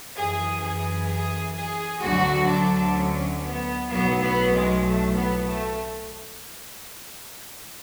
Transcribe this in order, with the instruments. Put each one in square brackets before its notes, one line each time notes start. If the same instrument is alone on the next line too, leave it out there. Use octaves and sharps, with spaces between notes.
[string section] F#2 E3 G#4
G#4
G#4
G#4
D2 D3 F#3 F#4
D4
C#4
B3
B1 A2 F#3 B3
B3
G#3
A3
B3
A3